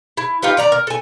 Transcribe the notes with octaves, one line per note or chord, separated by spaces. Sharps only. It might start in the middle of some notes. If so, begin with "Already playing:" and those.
E4
D#4 F4 G4 B4
D#3 D5 A#5
A#4
A4 G#5